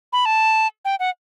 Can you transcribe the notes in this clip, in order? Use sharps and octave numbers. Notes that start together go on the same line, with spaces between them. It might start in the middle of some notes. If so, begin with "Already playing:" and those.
B5
A5
G5
F#5